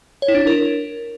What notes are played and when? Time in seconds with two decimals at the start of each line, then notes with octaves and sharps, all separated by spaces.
0.22 C#5
0.28 E4
0.35 D4
0.41 E4
0.47 A#4